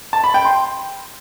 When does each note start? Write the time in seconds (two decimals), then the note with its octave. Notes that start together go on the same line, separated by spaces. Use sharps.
0.13 A5
0.24 B5
0.34 G5
0.45 C6